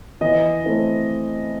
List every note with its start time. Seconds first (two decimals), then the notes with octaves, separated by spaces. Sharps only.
0.21 E3 D#5
0.64 A3 C4 E4